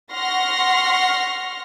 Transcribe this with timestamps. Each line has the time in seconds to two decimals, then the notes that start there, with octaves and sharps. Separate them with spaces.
0.12 F#5 C6 C#6 F6 A#6